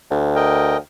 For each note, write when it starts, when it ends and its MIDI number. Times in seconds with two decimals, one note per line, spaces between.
0.11 0.77 38
0.36 0.77 70
0.36 0.77 75
0.36 0.77 79